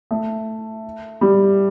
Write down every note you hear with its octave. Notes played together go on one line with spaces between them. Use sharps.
A3
G3